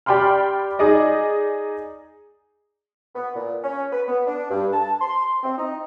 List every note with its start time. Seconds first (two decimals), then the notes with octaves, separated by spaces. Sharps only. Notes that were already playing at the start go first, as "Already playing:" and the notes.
0.06 G4 D5 G5 B5 C6 F6
0.79 D#4 G#4 D5 D#5
3.16 B3
3.36 A#2
3.64 C#4
3.93 B4
4.08 B3
4.27 D4
4.51 G2
4.73 A5
5.01 C6
5.44 C4
5.58 D#4